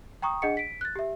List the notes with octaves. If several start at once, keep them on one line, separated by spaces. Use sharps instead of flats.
G5 A#5 C#6 D#6
D4 G#4 D#5 F#5 C#7
B6 D7
F#6 A6
G4 E5